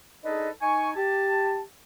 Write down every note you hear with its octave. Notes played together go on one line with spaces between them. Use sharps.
D4 D#4 G#4 A4 B4 D#5
D#4 G#5 C#6
G4 A5